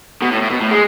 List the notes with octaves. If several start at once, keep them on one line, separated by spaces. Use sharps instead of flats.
B2
A2
A2
B2
A2
G#3